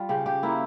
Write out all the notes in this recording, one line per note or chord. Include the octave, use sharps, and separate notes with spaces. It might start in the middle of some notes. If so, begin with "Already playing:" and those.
Already playing: G3 F4
C#3 G4
G4
A#3 E4